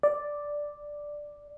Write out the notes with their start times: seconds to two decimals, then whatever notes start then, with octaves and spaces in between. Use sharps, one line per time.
0.03 D5